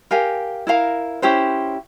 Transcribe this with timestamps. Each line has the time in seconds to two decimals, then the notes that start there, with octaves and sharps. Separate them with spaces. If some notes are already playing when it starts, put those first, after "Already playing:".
0.11 G4 A#4 F5 G#5
0.67 E4 A#4 F5 A#5
1.22 C#4 E4 G4 C5